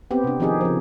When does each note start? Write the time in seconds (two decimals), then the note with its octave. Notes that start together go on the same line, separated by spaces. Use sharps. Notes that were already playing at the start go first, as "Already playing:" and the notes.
0.11 B3 C4 G4
0.24 C3 D4
0.40 D#3 F3 C4 D#4 G4 G#4
0.61 C#3 F3